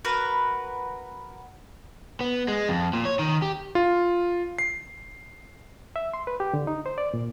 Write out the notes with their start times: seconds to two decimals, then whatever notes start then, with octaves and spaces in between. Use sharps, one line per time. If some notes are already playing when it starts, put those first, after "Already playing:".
0.05 F#4 A#4 B4
2.21 B3
2.48 G#3
2.69 F2
2.93 A#2
3.05 C#5
3.19 D#3
3.42 G4
3.75 F4
4.58 C7
5.96 E5
6.14 C6
6.27 B4
6.40 G4
6.54 D3
6.67 D#4
6.86 C5
6.98 D5
7.14 A#2